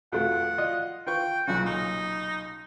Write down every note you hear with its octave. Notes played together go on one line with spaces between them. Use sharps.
F2 B2 A3 F#5
F4 D5 D#5
F4 B4 G5 C#6
B1 A#2 C#3 F#4
D#4